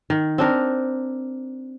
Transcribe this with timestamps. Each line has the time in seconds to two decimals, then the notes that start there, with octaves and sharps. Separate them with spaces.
0.10 D#3
0.38 C4 D4 A#4